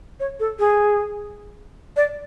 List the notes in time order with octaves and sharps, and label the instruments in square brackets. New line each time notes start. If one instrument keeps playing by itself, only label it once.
[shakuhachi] C#5
A4
G#4
D5